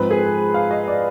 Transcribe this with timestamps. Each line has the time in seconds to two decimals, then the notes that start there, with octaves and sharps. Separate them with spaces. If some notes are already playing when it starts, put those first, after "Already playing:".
Already playing: G#2 F3 C4 B4
0.11 G#4
0.54 F5
0.71 D#5
0.87 D5